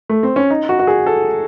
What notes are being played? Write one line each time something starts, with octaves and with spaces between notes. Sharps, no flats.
A3
C4
C#4
D#4
F#4
F#4
G#4
A4